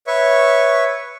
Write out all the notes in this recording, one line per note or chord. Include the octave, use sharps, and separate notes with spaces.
B4 C#5 E5 C#6